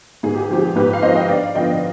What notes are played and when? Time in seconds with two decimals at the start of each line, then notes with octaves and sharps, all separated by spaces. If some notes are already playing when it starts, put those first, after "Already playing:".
0.23 G#2 G#4
0.35 G4
0.41 G#4
0.50 F3 C4 G4
0.59 G#4
0.76 G#2 G4 B4
0.93 F5
1.02 F3 C4 C5 D#5
1.15 D#5 G5
1.29 G2 D5 F5
1.55 D3 F3 B3 D#5 G5